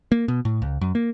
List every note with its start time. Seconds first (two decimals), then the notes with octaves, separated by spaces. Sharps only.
0.12 A#3
0.28 B2
0.45 A2
0.62 C#2
0.81 F#2
0.95 A#3